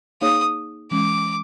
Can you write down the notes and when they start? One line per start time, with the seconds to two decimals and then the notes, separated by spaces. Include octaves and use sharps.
0.21 A#3 D#4 G#4 C#5 F5 D#6
0.91 E3 G#3 C#4 D6